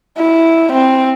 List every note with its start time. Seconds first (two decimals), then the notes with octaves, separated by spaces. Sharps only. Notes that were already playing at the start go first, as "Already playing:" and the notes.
0.18 E4
0.72 C4